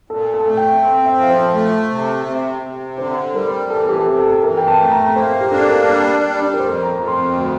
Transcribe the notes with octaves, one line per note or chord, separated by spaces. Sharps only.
A#2 A4
A4
A3
G5
C4
E5
F3
C5
A3
C3
C3
C3
D3 C5
G3 A#4
E3 A4
G4
A4
C3
A4
E3 A#4
G5
A5
A3
A#5
A#3 C5
G4
D4 A4
A#4
G3
G3
A#4
F2 C5
A#5
F2
C6
D2